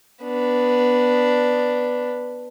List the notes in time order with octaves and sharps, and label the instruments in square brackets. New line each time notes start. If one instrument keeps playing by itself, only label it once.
[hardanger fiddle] B3 D4